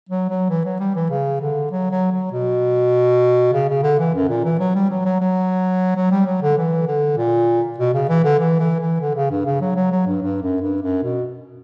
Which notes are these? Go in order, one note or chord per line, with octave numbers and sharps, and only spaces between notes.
F#3
F#3
E3
F#3
G3
E3
C#3
D3
F#3
F#3
F#3
B2
C#3
C#3
D3
E3
F#2
A#2
E3
F#3
G3
F#3
F#3
F#3
F#3
G3
F#3
D3
E3
D3
A#2
B2
C#3
E3
D3
E3
E3
E3
D3
C#3
G2
C#3
F#3
F#3
F#3
G2
G2
F#2
G2
F#2
B2